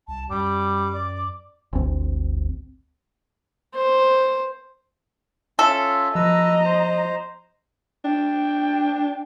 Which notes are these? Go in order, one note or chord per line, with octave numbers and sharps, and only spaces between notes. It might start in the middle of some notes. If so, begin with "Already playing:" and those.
C2 A5
F#2 G3 D6
D5
G1 D2 C4
C5
C#4 F4 A4 E5
F3 B4 D#5 A#5 E6
C5
D4 G5